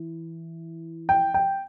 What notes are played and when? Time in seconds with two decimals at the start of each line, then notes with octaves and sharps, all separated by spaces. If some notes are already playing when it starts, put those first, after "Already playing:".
Already playing: E3
1.09 G5
1.34 G5